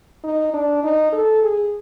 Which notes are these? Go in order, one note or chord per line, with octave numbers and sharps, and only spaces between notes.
D#4
D4
D#4
A4
G#4